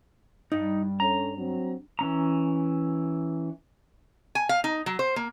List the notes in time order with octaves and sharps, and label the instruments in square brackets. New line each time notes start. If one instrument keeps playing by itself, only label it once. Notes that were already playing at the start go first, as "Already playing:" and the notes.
[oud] G2 [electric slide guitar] D#4
[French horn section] C#4 A4 C#5 [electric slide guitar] A#5
[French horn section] F#3 C4
[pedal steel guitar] E3 C#4 A#5
[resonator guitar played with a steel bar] G#5
F5
D#4
F#3
C5
A#3